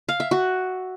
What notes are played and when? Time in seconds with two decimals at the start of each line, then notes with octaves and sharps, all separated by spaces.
0.09 F5
0.20 E5
0.31 F#4